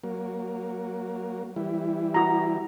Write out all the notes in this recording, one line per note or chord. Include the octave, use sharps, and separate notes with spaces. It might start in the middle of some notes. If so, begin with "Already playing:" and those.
F#3 A#3
E3 G3 E4
F#4 A#5